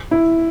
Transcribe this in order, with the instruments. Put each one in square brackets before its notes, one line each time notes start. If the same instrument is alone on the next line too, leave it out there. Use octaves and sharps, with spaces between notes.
[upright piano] E4